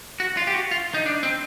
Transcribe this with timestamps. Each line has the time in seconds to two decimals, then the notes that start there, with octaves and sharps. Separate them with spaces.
0.20 F#4
0.37 F4
0.47 G4
0.54 F#4
0.71 F4
0.94 D#4
1.06 D4
1.23 C4